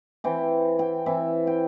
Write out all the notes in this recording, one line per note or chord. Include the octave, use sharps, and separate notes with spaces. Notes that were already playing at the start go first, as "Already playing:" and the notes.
E3 C4 E4 G5
G5
E3 C4 E4 E5
G5